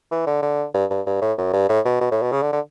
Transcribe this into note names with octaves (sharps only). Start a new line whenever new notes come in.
E3
D3
D3
G2
G2
G2
A2
F#2
G2
A2
B2
B2
A2
B2
C#3
D3
D3